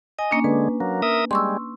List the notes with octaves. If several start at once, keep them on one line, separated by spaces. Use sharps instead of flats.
D#5 G#5
A#3 C#4 D4
D3 G#3 B4
F#3 A#3
A#4 E5 D#6
G3 G#3 C6 C#6 E6